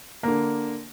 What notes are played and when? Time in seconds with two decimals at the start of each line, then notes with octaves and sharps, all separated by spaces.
0.23 D3 A#3